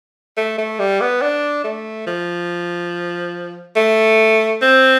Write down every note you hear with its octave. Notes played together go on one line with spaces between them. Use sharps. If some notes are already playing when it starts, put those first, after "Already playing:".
A3
A3
G3
B3
D4
A3
F3
A3
C4